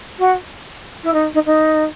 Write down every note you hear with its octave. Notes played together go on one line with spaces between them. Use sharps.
F#4
E4
D#4
D#4
D#4